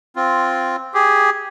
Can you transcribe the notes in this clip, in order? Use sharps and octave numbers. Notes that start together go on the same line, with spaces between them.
C4 F4
G4 G#4